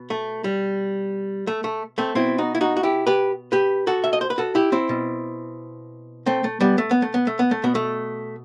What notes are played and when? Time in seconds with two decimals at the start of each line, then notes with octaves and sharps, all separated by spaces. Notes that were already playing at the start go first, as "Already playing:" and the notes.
Already playing: B2
0.10 A3
0.44 G3
1.47 A3
1.64 A3
1.98 A3 C4
2.15 B2 C4 E4
2.38 D#4 F#4
2.55 E4
2.61 D#4 F#4
2.77 F#4
2.83 E4 G4
3.07 G4 B4
3.52 G4 B4
3.87 F#4 A4
4.04 E5
4.13 D#5
4.21 C5
4.30 B4
4.38 F#4 A4
4.55 E4 G4
4.72 C4 E4
4.89 B2
6.26 A3 C4
6.44 A3
6.60 G3 B3
6.78 A3
6.91 B3
7.02 A3
7.14 B3
7.27 A3
7.39 B3
7.51 A3
7.63 B2 B3
7.75 A3